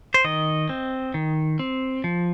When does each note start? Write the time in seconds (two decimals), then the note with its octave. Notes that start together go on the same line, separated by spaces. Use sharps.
0.14 C5
0.24 D#3 D#5
0.69 C4
1.14 D#3
1.59 C4
2.04 F3